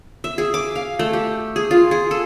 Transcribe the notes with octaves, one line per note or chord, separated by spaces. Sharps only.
E5
G#4
D6
F5
A3
G4
G#4
F4
G#4
A4